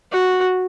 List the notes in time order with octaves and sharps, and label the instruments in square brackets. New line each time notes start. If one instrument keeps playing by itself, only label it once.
[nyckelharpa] F#4